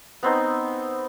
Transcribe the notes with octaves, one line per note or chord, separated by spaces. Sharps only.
B3 C4 D#4